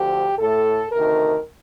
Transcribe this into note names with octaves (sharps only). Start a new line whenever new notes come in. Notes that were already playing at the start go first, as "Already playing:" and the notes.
Already playing: D2 D3 F3 G4
A2 A3 A4
D2 C3 D#3 A#4